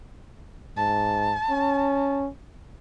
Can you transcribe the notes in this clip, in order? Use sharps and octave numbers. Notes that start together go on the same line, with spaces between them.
G#2 A5
C#4